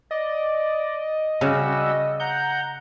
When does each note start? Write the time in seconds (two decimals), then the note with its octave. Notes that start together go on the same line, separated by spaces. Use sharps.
0.11 D5 D#5
1.41 C#3 G3 F#4 E6
2.20 F#5 A#5 G6